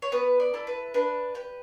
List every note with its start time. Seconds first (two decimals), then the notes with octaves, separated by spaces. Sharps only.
0.02 C#5
0.12 B3 B4
0.40 D5
0.54 E4 A4
0.67 B4
0.94 D4 B4
1.35 G4 B4